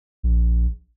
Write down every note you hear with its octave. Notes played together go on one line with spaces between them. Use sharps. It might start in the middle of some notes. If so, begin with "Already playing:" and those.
A#1